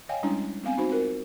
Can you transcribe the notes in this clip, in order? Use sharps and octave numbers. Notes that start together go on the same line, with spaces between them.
C#5 D#5 F5 G5 G#5
G3 G#3 C#4 D4 E4
B3 C4 F5 G#5
D#4 F#4 C5
C4 F4 A#4